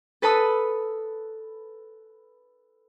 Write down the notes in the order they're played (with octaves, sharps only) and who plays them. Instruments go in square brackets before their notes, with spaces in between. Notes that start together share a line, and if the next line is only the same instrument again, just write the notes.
[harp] A4 B4 A5 B5 D#6 E6